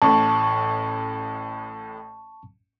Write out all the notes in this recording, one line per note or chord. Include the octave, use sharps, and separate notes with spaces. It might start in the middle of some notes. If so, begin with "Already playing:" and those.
A1 A2 A5 C#6